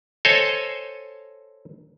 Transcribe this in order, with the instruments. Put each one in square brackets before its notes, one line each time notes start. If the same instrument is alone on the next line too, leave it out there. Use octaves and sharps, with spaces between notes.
[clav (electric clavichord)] A4 C5 C#5 D#5 G#5 A5